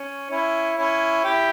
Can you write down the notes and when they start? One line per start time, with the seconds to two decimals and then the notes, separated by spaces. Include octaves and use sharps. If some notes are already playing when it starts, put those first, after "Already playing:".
Already playing: C#4
0.31 C#4 E4
0.77 C#4 E4
1.24 E4 G4